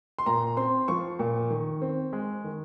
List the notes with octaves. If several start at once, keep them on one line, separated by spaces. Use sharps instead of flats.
C6
A#2 A#5
C4 C6
F3 C#6
A#2
D#3
C4
G#3
D#3